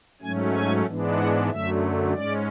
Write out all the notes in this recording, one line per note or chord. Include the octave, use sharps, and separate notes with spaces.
G#2 F#3 A3 C#4 G#5
G#5
G#2 E3 G#3 B3 D4
F#5
F#2 D3 F#3 A3 E5
G#2 G#3 C#4 D5